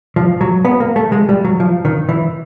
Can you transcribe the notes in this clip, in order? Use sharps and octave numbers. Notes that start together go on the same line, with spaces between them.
F3
F#3
B3
A#3
A3
G#3
G3
F#3
F3
D#3
E3